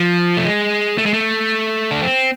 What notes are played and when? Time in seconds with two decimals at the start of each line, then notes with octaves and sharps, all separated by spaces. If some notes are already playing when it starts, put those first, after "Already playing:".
Already playing: F3
0.37 A3
0.45 G#3
0.98 A3
1.06 G#3
1.13 A3
1.91 D4
2.02 C4